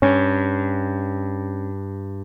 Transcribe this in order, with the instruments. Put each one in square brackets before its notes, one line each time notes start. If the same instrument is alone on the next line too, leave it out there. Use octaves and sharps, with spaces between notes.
[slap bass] G2 [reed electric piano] C#4